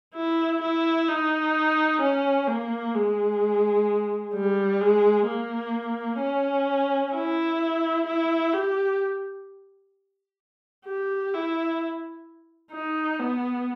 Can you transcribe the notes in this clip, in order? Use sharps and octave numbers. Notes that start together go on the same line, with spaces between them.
E4
E4
D#4
C#4
A#3
G#3
G3
G#3
A#3
C#4
E4
E4
G4
G4
E4
D#4
B3